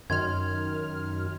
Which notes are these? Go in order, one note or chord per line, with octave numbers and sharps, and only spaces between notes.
F#2 D#3 C6 F6 G#6